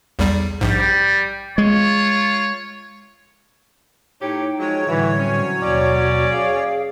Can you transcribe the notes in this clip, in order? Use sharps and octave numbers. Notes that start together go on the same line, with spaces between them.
B1 E2 G3
A#1 G#2 G3
G#3 F4 C#5
A2 D#4 G4 C#5 G5
F3 F#3 G#3 C#5
A2 D3 E3 G3 E4 F#4
F#3 C4 C#4
D#2 B2 C#4 D5
G#4 F5